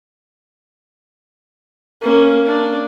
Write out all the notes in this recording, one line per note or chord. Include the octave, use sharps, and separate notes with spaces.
A#3 C#4
D4